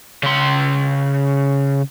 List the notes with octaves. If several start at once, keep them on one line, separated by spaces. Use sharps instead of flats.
C#3 C6